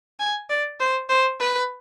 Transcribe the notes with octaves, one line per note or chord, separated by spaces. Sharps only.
G#5
D5
C5
C5
B4